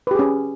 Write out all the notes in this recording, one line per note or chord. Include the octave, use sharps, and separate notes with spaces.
C#4 G4 G#4 B4